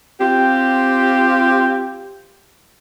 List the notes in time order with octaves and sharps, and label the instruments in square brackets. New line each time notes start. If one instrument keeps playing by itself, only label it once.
[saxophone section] C4 F4 G4